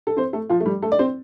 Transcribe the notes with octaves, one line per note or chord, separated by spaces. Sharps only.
A4
C4 C5
A3 A4
F3 F4
A3
G3
A3 A4
D5
C4 C5